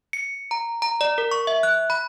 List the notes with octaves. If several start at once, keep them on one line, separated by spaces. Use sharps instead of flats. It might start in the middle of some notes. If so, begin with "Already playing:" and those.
C#7
A#5
A#5
D5
A#4
C#6
E5
F#6
B5